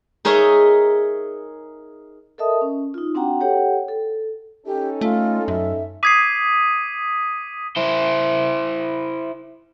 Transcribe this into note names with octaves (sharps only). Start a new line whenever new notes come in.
D#4 G#4 A#4 C#5 D#5 E5
A4 A#4 D#5 E5 A5 D#6
C#4
D#4 F4
C4 D4 F#4 F#5 G5 A#5
G4 A4 C#5 F#5 G5
A4
C#4 D#4 G4 A4
A3 F4
F#2 E5
D6 D#6 G#6 B6 C7 D#7
E4 C5